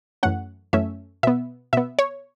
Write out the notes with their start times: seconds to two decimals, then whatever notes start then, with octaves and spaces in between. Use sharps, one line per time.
0.23 F#2 E3 A3 C#4 F#5
0.73 F#2 E3 A3 C#4 E5
1.23 B2 B3 E5
1.73 B2 B3 E5
1.99 C#5